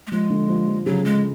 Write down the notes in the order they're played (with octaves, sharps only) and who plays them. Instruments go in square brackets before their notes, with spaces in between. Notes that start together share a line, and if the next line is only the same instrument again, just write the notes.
[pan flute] A3
[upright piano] F3 [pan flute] G#3
[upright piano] D3
F3
F3
[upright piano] C#3 [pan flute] F#3
[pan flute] G#3